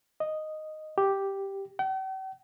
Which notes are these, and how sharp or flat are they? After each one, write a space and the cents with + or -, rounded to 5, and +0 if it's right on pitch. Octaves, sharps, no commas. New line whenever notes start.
D#5 -5
G4 +0
G5 -45